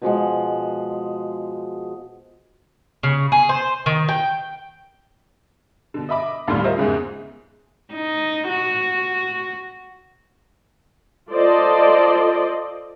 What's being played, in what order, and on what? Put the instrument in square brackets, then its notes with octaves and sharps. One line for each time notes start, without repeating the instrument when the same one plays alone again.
[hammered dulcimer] B2 F3 G#3 F#5
[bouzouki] C#3
G#4
C5
D#3
G5
[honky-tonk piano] B2 D3
D#5 E5 B5 D6
D#2 A2 D3 G3 C6 F6
F4 A#4 C5 D#5 E5
E2 G#2 C#3 E5
[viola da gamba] D#4
F#4
[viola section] F4 A4 C5 D5 D#5